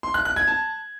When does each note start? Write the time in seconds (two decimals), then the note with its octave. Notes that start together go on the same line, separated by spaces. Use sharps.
0.03 C6
0.14 F#6
0.25 F#6
0.36 G#6
0.47 A5